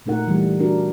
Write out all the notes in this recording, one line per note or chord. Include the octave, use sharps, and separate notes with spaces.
A#2 A3 D#4 A#4 F#5
E3 G3 A3
D4 F#4 A#4